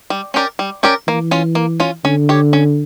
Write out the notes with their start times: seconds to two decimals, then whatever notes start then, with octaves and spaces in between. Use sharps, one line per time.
0.10 G3
0.34 C#4 G4 A#4 D5
0.59 G3
0.83 C#4 G4 A#4 D5
1.07 E3 A#3
1.31 C#4 F4
1.55 A#3
1.80 C#4 F4
2.05 D3 C#4
2.29 G4 C#5
2.53 C#4